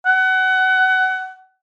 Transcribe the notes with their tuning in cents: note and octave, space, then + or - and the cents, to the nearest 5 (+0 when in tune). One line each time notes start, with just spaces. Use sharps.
F#5 +25